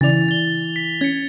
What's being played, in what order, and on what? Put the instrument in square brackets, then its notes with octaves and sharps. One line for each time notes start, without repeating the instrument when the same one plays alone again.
[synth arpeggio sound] C#3 D5 [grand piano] E3 [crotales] A6 F7
[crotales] A6 G7
B6
[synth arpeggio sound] C#4 [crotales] G#6 C#7